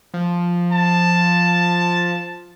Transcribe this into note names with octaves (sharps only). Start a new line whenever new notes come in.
F3
A5